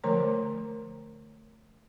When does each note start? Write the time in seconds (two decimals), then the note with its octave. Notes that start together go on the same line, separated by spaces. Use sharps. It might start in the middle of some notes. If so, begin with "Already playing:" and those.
0.04 D3 F3 A3 A#4 C#5 A#5